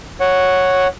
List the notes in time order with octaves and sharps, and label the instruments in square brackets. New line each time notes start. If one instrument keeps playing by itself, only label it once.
[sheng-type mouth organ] C#5 F#5